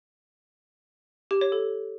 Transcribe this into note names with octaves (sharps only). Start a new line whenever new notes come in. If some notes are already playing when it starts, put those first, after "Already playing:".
G4
C#5
A4